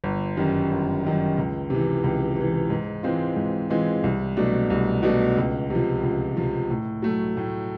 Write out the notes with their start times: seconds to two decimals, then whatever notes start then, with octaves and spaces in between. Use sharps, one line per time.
0.04 G1
0.37 F#2 D#3 G3
0.71 G1
1.04 F#2 D#3 G3
1.37 C#2
1.70 C3 E3
2.04 C#2
2.37 C3 E3
2.70 G#2
3.03 E3 G#3 C4 F4
3.36 G#2
3.70 E3 G#3 C4 F4
4.04 C2
4.37 B2 F#3 A3 D4
4.70 C2
5.03 B2 F#3 A3 D4
5.37 C#2
5.70 C3 F3
6.03 C#2
6.37 C3 F3
6.70 A2
7.02 F#3 A3
7.37 A2